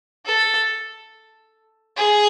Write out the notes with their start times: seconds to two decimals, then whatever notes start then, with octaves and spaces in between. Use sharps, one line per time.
0.26 A4
1.97 G#4